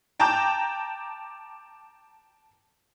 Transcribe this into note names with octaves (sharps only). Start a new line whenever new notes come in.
G5 A5 A#5 D6 G6